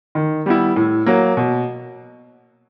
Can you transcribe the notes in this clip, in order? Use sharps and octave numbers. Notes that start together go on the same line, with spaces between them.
D#3
G3 B3 E4
A2
F#3 A#3
B2